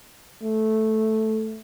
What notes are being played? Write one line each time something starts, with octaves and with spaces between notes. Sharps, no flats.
A3